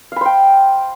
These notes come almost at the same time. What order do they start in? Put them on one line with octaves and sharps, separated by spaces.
F5 B5 C5 G5